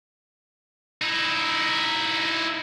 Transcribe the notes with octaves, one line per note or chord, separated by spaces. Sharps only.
D#4 E4